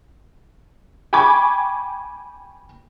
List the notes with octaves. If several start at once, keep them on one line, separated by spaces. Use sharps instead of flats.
G5 G#5 B5 C#6 D6 G#6